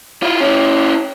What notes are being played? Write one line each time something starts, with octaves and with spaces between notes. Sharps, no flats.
E4 F4
C#4 E4